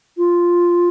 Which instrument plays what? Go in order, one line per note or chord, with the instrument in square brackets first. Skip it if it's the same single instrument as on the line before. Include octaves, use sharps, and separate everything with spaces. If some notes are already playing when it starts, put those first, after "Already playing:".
[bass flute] F4